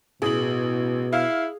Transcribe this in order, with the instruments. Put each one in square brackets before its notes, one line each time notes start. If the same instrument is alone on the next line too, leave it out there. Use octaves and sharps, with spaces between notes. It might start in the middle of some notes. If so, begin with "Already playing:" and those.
[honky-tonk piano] A1 F#7 [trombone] B2 [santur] G#4
[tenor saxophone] E4 [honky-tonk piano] F5